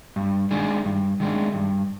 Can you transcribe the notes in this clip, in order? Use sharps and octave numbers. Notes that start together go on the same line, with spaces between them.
G2
D#3 G#3 D4
G2
D#3 G#3 D4
G2